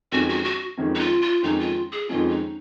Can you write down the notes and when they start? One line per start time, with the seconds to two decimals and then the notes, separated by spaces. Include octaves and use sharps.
0.12 F2 D#3 G#3 C#4 F#4
0.29 F#4
0.44 F#4
0.77 F2 D#3 G#3 C#4
0.95 D#4
1.00 F4
1.22 F4
1.43 F2 D#3 G#3 C#4 D#4
1.60 F4
1.92 G#4
2.09 F2 D#3 G#3 C#4 F4
2.30 D#4